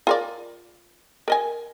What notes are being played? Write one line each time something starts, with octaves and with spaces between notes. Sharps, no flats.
F4 A#4 D5
A#4 D#5 G#5